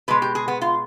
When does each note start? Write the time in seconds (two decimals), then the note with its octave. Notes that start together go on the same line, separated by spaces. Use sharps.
0.08 B2 G#3 B4
0.22 G4
0.35 G#4
0.48 B3
0.61 F4